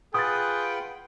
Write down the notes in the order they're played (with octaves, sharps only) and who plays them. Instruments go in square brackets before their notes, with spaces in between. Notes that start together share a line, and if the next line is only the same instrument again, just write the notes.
[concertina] F4 B4 F#5 [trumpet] G#4 [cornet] G5 [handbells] D#6 A6